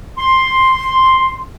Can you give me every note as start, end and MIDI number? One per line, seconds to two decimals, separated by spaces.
0.18 1.41 84